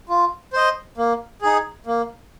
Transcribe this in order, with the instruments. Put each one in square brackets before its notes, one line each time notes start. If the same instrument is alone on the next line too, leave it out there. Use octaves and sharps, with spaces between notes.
[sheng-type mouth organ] F4
C5 D#5
A#3
D#4 G#4
A#3